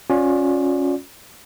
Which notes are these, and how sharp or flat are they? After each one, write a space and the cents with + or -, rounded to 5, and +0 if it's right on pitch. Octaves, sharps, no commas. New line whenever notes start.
C#4 +0 F4 +40 D5 +0